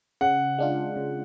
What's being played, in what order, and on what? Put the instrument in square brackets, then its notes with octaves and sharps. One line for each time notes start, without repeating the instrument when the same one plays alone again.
[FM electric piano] C#3 [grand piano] F#5
[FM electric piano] G#3 D4 F4
C#3